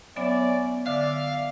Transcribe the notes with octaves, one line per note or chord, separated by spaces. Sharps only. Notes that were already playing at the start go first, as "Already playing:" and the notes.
F#3 B3 C#4 D5 E5
D3 D5 E5 F5